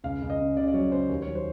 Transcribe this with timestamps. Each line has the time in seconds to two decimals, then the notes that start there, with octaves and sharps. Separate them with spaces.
0.04 C#2 F5
0.22 C#2
0.30 D#5
0.39 C#3
0.56 C#3 D5
0.68 D5
0.74 F#3 C#5
0.91 C#3 C5
1.09 D#2 C#5
1.22 C#5
1.27 F#3
1.35 C5